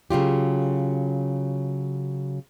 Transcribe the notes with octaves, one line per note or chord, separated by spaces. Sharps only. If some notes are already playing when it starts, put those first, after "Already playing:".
C#3 F#3 F4 G4